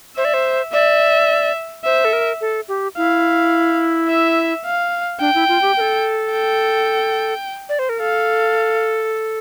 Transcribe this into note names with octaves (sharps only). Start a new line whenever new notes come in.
C5 E5
D5
C5
D5 E5
C5 E5
A4
A#4
A4
G4
E4 F5
E5
F5
D4 G5
E4
F4
G4
A#4
A4
G5
D5
C5
A#4
A4 F5